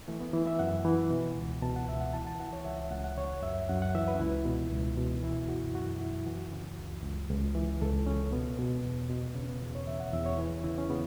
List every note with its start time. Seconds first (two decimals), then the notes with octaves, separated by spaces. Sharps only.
0.08 E3 A3
0.20 B3
0.33 E3
0.47 E5
0.59 F#2 F#5
0.85 E3
1.10 B2
1.36 C#2
1.62 B2 A5
1.76 F#5
1.89 C#2 E5
2.01 F#5
2.14 E3 A5
2.27 A5
2.39 E3 F#5
2.53 C#5
2.65 C#2 E5
2.91 C#2 F#5
3.04 F#5
3.17 C#3 C#5
3.42 F#2 E5
3.69 F#2 F#5
3.82 F#5
3.95 E3 E5
4.08 B4
4.15 C#4
4.20 C#2 E4
4.45 B2
4.72 C#2
4.97 B2
5.23 E3 E4
5.49 F#2 F#4
5.75 F#2 F#4
6.00 F#2 E4
6.27 E3 F#4
6.52 C#3
6.78 C#2
7.03 C#2
7.30 C#2
7.55 E3
7.81 C#2 A4
8.07 C#3 C#4
8.32 B2 B3
8.58 B2
8.84 E2
9.10 B2
9.35 C#3
9.43 C#4
9.48 B3
9.62 E2
9.75 C#5
9.87 E3 E5
10.00 F#5
10.13 E2 E5
10.26 C#5
10.38 E3 B4
10.64 C#3 E4
10.78 C#4
10.90 C#3 B3